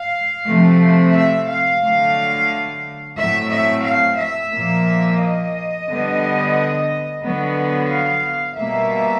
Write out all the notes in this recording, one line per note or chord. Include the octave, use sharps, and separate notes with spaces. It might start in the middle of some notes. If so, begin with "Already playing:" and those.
Already playing: F5
C3 F3 A3 C4
E5
F5
D3 F#3 A3
A2 F#3 A3 C4 E5
E5
F5
E5
A#2 F3 A#3
D#5
D3 G3 B3
D3 F#3 B3
F5
B2 G3 A#3 E5